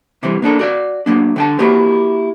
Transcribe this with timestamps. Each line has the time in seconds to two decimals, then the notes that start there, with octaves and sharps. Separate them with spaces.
0.23 C3 E3 G3 C4
0.42 A#3 D4 A4 A#4
0.59 F#4 D5 F5
1.06 F#3 A#3 D4
1.36 D3 G5 A5
1.59 A#3 E4 F#4 G4 A#4